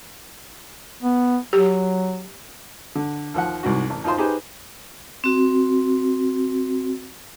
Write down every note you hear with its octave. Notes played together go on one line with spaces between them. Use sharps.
B3
F#3 G4
D3
D#2 F3 F#5
C2 G#2 F#4
A1
D#2 D#4 F4 C5 C6
D#4 G4 G#4 B4 C5
C4 F#4